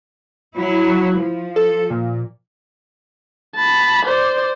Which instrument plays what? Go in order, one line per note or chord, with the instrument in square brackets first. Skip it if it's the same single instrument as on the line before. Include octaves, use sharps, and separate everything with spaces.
[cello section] F#3 E4
F3
[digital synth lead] A4
A#2
[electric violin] A5 B5
C5 D5